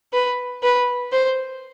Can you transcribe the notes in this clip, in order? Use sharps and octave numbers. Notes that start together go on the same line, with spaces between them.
B4
B4
C5